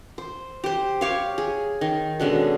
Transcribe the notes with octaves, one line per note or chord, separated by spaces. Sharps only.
C5
G4 C5
G4 C#5 F5
G#4
D#3
B2 D3 G#3 C#4